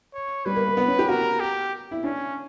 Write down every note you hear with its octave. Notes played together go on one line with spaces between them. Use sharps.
C#5
G3 B4
A#3
A#3
B3
C#4
G4
F#4 A#4
G4
E4
C#4 D4